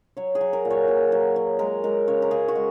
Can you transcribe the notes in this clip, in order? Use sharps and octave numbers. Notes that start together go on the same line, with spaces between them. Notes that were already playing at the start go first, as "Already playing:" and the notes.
F#3 C#5
G#4
F#3
A#4
A#2
C#5
A#2
F#3
F#3
G#3 A#4
G#3 A#4
C#3 C#5
A#4
C#3 G#4
F#4
G#3